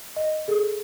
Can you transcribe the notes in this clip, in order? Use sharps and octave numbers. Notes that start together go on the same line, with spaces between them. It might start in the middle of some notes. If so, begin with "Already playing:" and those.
D#5
G#4 A4